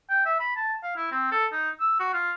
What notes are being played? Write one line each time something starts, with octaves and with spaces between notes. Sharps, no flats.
G5
E5
B5
A5
F5
E4
C4
A4
D#4
E6
F#4
F4